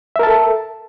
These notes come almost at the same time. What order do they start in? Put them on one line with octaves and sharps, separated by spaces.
E5 A#4 A5 A4